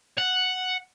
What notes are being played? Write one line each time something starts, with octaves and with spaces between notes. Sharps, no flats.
F#5